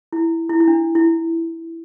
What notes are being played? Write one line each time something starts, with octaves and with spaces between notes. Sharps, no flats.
E4
E4
E4
D4
E4